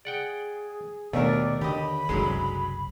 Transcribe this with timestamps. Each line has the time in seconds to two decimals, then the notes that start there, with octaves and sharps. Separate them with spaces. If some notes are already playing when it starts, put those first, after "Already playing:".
0.05 G#4 D5 F#5 G5
1.13 D#2 B2 A3 D4 A#4 D5
1.61 D3 G4 D#5 B5
2.09 F#1 C2 F#2 D3 F#3 G#3